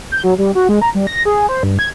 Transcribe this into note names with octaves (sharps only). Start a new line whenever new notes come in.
G6
F#3
G3
F#4
G#3
A#5
G3
A#6
G#4
C5
G2
G#6